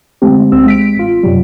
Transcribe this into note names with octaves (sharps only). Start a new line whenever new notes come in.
D3 G#3 A3 C4 G4
C#2 C4 E6
G#3 B6 D7
A1 F4
F#2 C3 F#3 G3